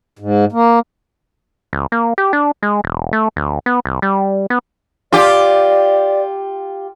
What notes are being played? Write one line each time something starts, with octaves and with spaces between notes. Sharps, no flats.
G#2
A#3
C#2
A#3
G4
D4
G#3
E1
A3
D2
B3
C2
G3
B3
F4 G4 D5